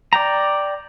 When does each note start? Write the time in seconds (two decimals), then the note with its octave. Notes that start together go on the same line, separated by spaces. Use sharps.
0.13 D5 G5 A#5